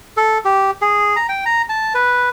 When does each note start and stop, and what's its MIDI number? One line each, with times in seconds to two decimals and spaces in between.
0.17 0.38 69
0.45 0.71 67
0.82 1.16 68
1.16 1.27 82
1.29 1.44 79
1.46 1.62 82
1.69 1.93 81
1.94 2.29 71